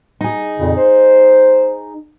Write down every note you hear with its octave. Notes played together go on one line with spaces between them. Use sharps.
D#4 G#4
F2 A#2 C#3
C5